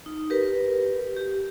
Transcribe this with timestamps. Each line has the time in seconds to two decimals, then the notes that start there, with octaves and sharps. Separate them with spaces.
0.06 D#4
0.30 G4 A#4 B4
1.16 G4